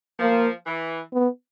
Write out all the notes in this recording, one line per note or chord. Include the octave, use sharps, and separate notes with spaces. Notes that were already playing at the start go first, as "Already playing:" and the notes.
F3 A#3
E3
B3